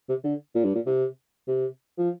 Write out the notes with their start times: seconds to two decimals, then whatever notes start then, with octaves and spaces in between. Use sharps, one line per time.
0.09 C3
0.24 D3
0.55 A#2
0.65 G2
0.75 A#2
0.86 C3
1.47 C3
1.98 F3